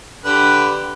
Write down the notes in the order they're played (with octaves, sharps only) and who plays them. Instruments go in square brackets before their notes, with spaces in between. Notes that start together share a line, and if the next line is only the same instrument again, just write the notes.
[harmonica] D3 G4 B4